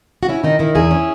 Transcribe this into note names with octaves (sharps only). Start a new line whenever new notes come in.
F#4
C#4 E4
D#3 D#4
D#3 E4
E2 E4 G#4
C#4